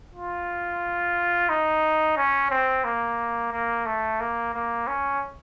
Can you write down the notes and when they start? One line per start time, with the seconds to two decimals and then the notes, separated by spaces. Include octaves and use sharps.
0.14 F4
1.49 D#4
2.17 C#4
2.51 C4
2.85 A#3
3.52 A#3
3.86 A3
4.20 A#3
4.54 A#3
4.87 C#4